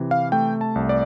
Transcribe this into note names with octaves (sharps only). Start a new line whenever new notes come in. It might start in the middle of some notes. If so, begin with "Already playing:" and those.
Already playing: C3 E3
F5
A3 G5
A5
C2
D5